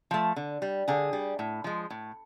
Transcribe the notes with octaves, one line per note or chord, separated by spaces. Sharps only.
F3 A3
D3
G3
D3 G#4
G3
A2
F3 G#3
A2